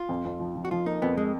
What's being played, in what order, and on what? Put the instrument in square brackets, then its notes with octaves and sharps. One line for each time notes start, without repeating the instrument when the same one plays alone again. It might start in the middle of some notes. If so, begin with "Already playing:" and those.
Already playing: [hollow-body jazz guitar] F4
[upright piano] F2
F2
F3
F3
[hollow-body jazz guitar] F#4
[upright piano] F3 [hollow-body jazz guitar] F4
[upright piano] A#3 [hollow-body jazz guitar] D#4
[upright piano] F2 [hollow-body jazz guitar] B3
[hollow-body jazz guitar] G#3